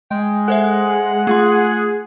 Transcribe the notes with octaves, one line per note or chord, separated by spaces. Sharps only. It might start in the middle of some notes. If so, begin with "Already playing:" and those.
G#3 G5
A4 C5 E5 F#5
A3 F4 G#4 C6